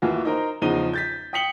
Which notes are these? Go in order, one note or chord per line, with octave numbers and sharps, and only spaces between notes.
D#2 E3 F4 F#4
D#4 A#4 C5
E2 C#3 F3 D#4 D#7 G7
G6 A6 B6
G5 D#6 B6 C#7 F#7 G7